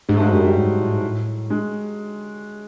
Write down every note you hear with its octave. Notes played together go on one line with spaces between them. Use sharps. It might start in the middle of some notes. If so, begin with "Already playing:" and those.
G#2 G#3
A3
G#3
F#3
F#2 G3
G3
G#2
A2
G#2
A2
G#3